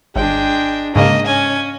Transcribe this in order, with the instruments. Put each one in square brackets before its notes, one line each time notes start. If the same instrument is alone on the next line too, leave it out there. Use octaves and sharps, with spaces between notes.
[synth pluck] G#1 [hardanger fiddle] G#3 D4 [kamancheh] G5
[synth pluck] G#2 C#3 [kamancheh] A#3 [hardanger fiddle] D#5
[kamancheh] C#4 [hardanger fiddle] G#5